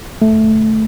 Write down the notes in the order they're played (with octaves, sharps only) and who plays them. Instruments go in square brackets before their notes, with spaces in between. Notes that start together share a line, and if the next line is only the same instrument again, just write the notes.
[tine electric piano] A3